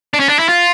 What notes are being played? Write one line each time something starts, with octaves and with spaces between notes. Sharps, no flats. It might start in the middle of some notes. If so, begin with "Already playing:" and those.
D4
C#4
D4
E4
F4